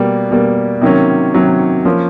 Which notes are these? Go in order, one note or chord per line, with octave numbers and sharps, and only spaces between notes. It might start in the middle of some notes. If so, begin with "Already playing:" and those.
Already playing: B2 G3 A#3
B2 G3 A#3
C3 D#3 F#3 A#3 C#4
C3 D#3 F#3 A#3 C#4
F3 A#3 C#4